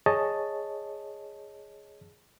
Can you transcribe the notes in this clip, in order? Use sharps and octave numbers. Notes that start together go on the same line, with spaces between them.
G#4 C#5 D#5 A5